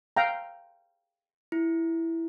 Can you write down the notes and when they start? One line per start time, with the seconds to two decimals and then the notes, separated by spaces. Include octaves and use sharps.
0.17 F5 G5 A#5
1.52 E4